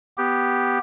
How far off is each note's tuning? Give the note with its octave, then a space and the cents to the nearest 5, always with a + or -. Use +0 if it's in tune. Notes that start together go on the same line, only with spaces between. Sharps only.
B3 +0 G4 +0